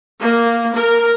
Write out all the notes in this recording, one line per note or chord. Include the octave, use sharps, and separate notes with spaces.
A#3
A#4